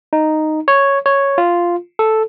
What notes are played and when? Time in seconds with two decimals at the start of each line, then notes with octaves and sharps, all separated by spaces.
0.13 D#4
0.68 C#5
1.06 C#5
1.38 F4
1.99 A4